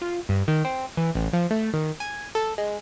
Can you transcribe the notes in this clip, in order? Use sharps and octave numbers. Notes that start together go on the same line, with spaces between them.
F4
G2
D#3
C4
E3
A1
F3
A3
D#3
G#5
A4
G#3